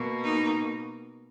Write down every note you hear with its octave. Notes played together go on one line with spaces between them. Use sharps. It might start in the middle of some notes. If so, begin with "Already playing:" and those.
Already playing: B2 A#3
D#4